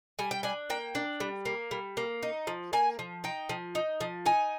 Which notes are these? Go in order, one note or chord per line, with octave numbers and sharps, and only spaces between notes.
G3 G#5
G5
D4 G#5
A#3 G5
D4
G3
A#3
G3
A#3
D#4
F3
A#3 G#5
F3
D#4 G5
F3
D#4
F3
D#4 G#5